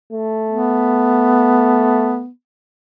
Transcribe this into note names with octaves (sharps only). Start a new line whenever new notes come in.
A3
B3